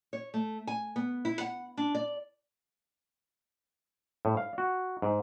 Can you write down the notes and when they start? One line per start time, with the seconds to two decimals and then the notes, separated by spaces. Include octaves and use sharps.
0.13 C#5
0.34 A3
0.67 G#5
0.96 B3
1.25 E4
1.40 F#5
1.77 D4
1.95 D5
4.25 A2
4.37 F5
4.58 F#4
5.02 G#2